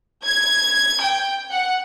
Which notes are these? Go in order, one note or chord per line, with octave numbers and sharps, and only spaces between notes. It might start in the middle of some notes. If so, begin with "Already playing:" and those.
G#6
G5
F#5